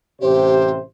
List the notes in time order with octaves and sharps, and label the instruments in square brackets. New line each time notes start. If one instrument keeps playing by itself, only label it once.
[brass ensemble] A1 C3 C5 [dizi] G4